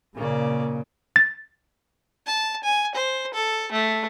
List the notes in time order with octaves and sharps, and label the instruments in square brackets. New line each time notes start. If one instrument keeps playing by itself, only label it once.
[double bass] A#2 C#3 [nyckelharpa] A#3 D5
[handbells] A6
[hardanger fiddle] A5
G#5
C5
A4
A3